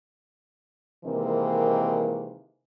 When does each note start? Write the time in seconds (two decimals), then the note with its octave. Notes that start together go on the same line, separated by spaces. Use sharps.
1.05 C3 D#3 E3 G#3 A#3 C4